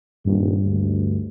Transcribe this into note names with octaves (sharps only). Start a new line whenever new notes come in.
D#1 G2
D2